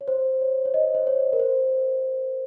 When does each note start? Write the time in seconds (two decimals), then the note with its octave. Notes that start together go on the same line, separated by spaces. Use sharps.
0.01 C#5
0.08 C5
0.41 C#5
0.65 C#5
0.74 D#5
0.95 C5
1.07 C#5
1.33 A#4
1.39 C5